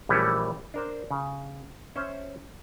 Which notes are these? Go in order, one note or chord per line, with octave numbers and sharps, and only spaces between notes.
A#1 E3 G3 A3 C#4
D4 A#4 C5
C#3
C#4 C5 E5